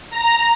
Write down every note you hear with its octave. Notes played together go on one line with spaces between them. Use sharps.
A#5